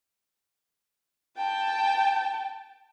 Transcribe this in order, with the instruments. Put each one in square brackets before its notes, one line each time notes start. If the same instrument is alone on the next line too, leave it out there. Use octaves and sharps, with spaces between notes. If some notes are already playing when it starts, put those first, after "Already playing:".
[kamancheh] G5 A5